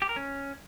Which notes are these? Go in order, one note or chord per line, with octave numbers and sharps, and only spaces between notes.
G4
A#4
C#4